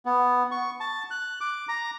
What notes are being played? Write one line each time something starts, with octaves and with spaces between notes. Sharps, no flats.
B3
C#6
A5
F#6
D6
A#5